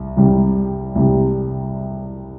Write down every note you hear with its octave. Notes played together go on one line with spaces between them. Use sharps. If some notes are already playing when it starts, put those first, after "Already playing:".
Already playing: C2
C2 C3 G3
C2 C3 G3